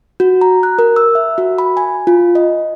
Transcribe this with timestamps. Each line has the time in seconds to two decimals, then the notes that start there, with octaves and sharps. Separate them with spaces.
0.20 F#4
0.41 A#5
0.63 F#6
0.79 A#4
0.96 E6
1.15 E5
1.38 F#4
1.58 B5
1.77 G#5
2.07 F4
2.35 D#5